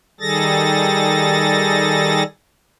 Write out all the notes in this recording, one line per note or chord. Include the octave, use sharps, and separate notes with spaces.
D#3 G3 G#4 A4 A6 A#6